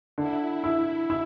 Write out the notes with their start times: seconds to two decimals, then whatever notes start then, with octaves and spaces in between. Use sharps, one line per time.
0.18 D3 E4
0.64 E4
1.10 E4